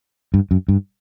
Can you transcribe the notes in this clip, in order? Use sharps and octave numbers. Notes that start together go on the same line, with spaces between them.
G2
F#2
G2